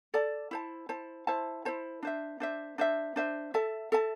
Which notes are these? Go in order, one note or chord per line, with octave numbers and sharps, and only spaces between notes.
A4 D5 A5
E4 C5 A5
E4 C5 A5
E4 C5 A5
E4 C5 A5
D4 C5 E5
D4 C5 E5
D4 C5 E5
D4 C5 E5
A4 E5 A5
A4 E5 A5